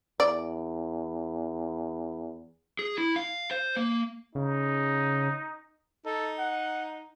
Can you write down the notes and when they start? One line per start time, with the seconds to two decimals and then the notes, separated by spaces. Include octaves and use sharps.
0.20 E2 D5
2.79 G#4
2.98 E4
3.16 F5
3.51 C5
3.77 A#3
4.35 C#3 D#4
6.06 D#4 A4
6.39 F#5